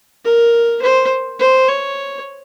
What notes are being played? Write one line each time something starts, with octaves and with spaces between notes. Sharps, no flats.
A#4
C5
C5
C#5